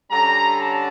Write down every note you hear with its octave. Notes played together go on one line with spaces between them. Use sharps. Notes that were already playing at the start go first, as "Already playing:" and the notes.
D3 G3 C#4 A#5
A5